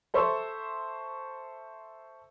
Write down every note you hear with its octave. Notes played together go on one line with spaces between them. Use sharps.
A4 C5 E5 C#6 E6